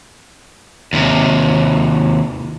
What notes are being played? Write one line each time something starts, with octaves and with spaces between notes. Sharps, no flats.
D#2 C3